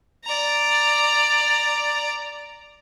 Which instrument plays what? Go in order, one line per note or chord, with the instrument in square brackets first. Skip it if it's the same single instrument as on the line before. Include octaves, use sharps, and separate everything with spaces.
[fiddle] D5 A#5